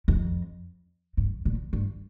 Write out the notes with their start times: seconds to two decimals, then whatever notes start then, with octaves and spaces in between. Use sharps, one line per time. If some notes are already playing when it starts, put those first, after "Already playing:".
0.08 F2
1.17 G2
1.45 A#2
1.73 G2